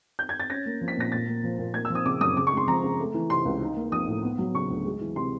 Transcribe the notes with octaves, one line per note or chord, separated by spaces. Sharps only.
G6
G#6
A6
C#4 A#6
A#3
F3
B6
A#2 A#6
A#2 A6
A#3
F3
A#2
A#3 G#6
E6
F3
D#6
C#3 D6
F#2 D#6
C#3 D6
C#6
G#3 C6
F3 A#5
C#3
A3
E3
C3 C6
C#2
D#4
A#3
F3 D#6
A2
B3
F#3
C#3 C#6
D2
G#3
E3
C3 C6